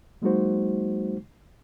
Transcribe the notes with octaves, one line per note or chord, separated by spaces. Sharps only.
F#3 G#3 A#3 D#4 F#4 C5